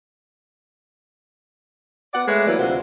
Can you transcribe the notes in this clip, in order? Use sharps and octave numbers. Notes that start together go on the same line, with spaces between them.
B3 D5 F#5
G#3 A3 B4 C#5 E5
E3 F#3 A#3 B4 D5
D2 C3 F4 F#4 C5